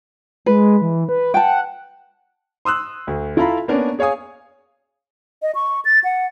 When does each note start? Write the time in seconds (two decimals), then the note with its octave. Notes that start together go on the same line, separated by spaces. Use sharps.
0.46 G#3 B4
0.82 E3
1.09 B4
1.34 F#5 G5 A5
2.65 C6 D#6 E6 F#6
3.07 D2
3.37 E4 F4 A4 F5 A#5 B5
3.68 A#3 B3 C#4 D4 A#4
3.99 G#4 C#5 F5 G#5 D#6
5.42 D#5
5.55 C#6
5.85 A6
6.04 F#5